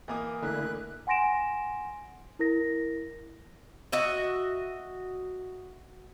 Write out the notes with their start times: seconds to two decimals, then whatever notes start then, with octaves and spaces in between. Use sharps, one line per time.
0.08 E3 A#3 D#5 D6 D#6
0.42 D3 A3 E4 A#4 D#5 F#6
1.07 F#5 G#5 C6 A#6 D7 E7
2.39 E4 A#4 A#6
3.92 F#4 D#5 E5